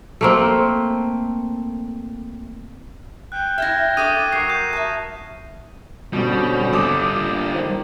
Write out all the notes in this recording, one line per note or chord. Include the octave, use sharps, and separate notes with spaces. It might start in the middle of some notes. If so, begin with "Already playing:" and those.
A3 A#3 C4
G5 F#6
E4 E5 F6 G#6 A#6
D4 A4 E5 C#6 D#6 D#7
F#3 A#4 C7
G6
E5 A5
B2 D3 G3 C4 C#4
G3 A4 D6 D#6
A#2 D3 F4
D#3 C5